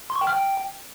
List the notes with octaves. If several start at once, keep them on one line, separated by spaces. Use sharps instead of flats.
C6
C#6
G5
F6
G5